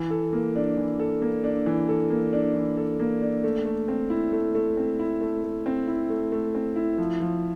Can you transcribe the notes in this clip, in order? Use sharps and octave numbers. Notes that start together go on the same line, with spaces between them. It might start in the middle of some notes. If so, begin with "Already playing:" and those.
Already playing: E3
A4
A#3
D4
E3
A4
A#3
D4
E3
A4
A#3
D4
E3
A4
A#3
D4
A3
A3
C4
E4
A3
A3
C4
E4
A3
A3
C4
E4
A3
A3
C4
E4
F3
F3